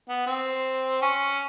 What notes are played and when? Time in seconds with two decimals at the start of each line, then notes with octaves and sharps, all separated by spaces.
0.09 B3
0.27 C4
1.02 C#4